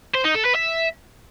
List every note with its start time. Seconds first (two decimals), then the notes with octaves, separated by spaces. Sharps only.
0.14 C5
0.24 D#4
0.34 A4
0.45 B4
0.55 E5